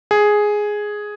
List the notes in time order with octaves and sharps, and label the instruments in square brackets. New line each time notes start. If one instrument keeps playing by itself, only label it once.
[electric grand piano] G#4